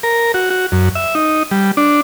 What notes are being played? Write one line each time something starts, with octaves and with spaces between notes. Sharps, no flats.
A#4
F#4
F#4
F#2
E5
D#4
G3
D4